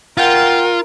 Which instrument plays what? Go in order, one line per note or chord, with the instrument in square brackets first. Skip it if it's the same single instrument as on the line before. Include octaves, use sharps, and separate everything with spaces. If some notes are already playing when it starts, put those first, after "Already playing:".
[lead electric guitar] F4 [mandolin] F#4 G5 [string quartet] A#4